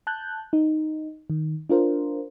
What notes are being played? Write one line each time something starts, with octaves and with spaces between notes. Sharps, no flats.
A5 F#6 G6
D#4
D#3
D4 F4 A#4 C5